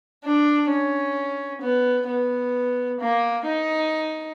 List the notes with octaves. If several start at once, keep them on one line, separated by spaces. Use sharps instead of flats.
D4
C#4
B3
B3
A#3
D#4